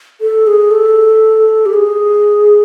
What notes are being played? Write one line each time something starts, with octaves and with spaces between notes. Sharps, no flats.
A4
G#4
A4
G4
G#4